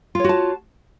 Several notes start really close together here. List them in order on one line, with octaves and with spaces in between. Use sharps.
F4 C#5 F#4 A5